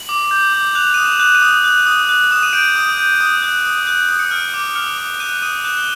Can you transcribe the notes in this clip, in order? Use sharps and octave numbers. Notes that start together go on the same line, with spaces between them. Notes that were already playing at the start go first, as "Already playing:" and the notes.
Already playing: F#7
D6
G6
D6
F#6 F7
D#6 D#7
E7
F#6
D#7
D#6
F#6
D#6
F#6
D#6 E7
D#7
G6 D7
D#6
G6
D#6
F#6
D#6
F#6
D#6
C#7
F6 D7
D6
F6 C#7
D6
F#6 D#7
D#6 D#7
F#6 E7
G7